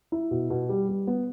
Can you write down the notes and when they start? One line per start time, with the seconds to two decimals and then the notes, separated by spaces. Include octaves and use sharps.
0.12 E4
0.31 B2
0.50 B2
0.69 G3
0.89 G3
1.07 B3